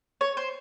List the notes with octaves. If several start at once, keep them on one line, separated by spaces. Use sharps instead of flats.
C#5
C5